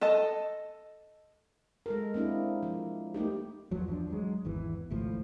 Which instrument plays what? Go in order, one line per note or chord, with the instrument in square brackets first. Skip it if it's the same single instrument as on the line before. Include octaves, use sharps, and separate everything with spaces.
[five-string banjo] A4 D#5 A5
[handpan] G#3 A4 A#4
A#3 C4 D4 E4
F3
A3 A#3 D#4 G4
[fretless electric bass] E2 F3 F#3
E2 F3 D4
F#3 G#3
G#1 E2 E3
G#1 C#2 A2 F3